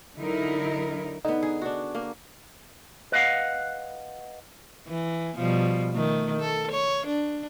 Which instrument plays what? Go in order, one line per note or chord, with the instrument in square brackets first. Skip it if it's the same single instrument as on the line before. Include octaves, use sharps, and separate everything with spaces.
[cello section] D3 F#3 D#4 E4 A#4
[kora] D3 B3 [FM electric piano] D#4
[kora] G#4
D4 F#4
A#3
[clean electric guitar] B4 D#5 F5 F#5
[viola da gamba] E3
B2 F3 G3
D#3 A3
A4
C#5
D4